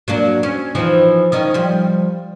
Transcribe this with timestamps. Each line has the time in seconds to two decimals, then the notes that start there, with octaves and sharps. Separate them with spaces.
0.08 F#3 A#3 D4
0.43 C#4
0.75 E3 F3 D#4
1.32 D#3 C#4 D#5
1.54 F3 G3